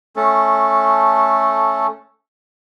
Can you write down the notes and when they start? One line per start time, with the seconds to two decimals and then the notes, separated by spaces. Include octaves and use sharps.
0.16 A3 C#4 A4